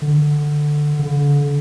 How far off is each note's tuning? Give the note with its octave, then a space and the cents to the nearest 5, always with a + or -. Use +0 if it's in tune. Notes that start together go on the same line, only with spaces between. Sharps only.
D3 +10
D3 -35